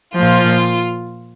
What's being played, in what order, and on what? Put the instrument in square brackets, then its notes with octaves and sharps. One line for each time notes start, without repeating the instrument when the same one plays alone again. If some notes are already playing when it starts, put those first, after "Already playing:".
[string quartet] A#2 F3 F4